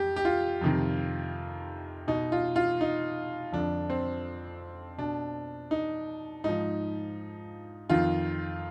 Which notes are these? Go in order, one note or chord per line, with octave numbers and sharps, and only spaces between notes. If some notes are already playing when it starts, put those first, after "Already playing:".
Already playing: F2 G4
G4
F4
F2 C3 D#3
B2 D#4
F4
F4
D#4
F2 D3 F3 D4
C4
B2 D4
D#4
G#2 F3 D#4
F2 D#3 F4